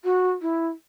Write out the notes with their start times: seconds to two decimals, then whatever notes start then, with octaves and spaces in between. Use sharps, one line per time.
0.04 F#4
0.41 E4